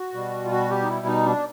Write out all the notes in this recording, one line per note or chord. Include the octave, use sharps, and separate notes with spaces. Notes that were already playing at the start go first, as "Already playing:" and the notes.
Already playing: F#4
B2 G3
F4
F#4
G4
D#4
E4
D#4
D4